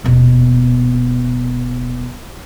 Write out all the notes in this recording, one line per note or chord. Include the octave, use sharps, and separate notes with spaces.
D#1 B2